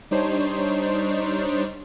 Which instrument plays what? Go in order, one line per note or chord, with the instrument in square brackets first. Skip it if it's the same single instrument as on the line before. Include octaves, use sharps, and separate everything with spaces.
[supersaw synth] G3 D4 D#4 C5 C#5